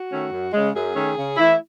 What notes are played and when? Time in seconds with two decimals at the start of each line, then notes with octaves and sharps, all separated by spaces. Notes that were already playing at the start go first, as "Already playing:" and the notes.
Already playing: F#4
0.11 D#3 A3 C#4
0.32 F#2
0.53 C#3 G#3
0.74 F#2 G#4
0.95 D#3 A3 C#4
1.16 C#3
1.37 E3 A3 E4